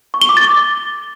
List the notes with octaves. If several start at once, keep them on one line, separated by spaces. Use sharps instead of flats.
C#6
G7
D6
A6